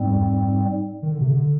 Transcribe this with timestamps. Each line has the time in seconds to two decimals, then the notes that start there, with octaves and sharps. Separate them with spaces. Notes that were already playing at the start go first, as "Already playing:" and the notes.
Already playing: G#2 G3 C4
0.10 F2
1.02 D#3
1.11 D3
1.21 C3
1.31 D3